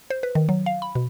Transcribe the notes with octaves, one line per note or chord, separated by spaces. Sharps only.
C5
B4
D#3
F#3
F5
B5
B2